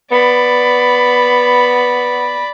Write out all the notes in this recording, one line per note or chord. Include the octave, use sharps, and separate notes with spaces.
B3 D5 B5